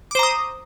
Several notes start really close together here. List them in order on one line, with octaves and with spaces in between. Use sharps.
D6 C5 A#5 D#6